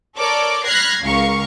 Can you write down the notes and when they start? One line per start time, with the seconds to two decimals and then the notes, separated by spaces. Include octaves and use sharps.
0.17 A4 A#4 C#5 D5 D6
0.65 B5 F6 F#6 G#6 A#6 C7
1.02 C#2 A#4 F5 C#6